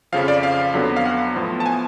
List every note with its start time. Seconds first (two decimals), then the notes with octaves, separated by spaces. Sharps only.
0.12 F2 C#3 F3 F5
0.28 D5
0.43 F5
0.74 F2 D3 F#3 B3
0.96 F5
1.05 F#5
1.36 A2 F3 B3
1.60 A5
1.66 G#5